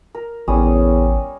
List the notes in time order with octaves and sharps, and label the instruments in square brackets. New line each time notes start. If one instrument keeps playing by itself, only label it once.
[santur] A#4
[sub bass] A1 [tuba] E2 [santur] G3 C#4 D#6